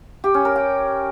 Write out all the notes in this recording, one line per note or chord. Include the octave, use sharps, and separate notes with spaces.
G4
C#4
A#4
G5